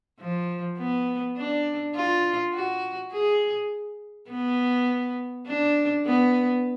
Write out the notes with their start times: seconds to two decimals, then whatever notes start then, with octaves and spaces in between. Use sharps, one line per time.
0.20 F3
0.78 B3
1.37 D4
1.96 F4
2.54 F#4
3.13 G#4
4.30 B3
5.47 D4
6.06 B3